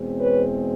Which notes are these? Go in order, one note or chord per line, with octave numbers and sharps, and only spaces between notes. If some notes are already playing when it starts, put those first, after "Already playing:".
Already playing: E2 B2 G#3 C4
B4 C#5